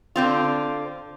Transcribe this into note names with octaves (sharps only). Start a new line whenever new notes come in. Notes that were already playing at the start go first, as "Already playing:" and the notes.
D3 C4 F4